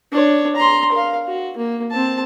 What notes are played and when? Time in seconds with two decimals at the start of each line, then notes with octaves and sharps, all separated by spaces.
0.12 D4 C#5
0.56 A#5 C6
0.92 A#4 F5
1.27 F#4
1.57 A#3
1.91 C4 A5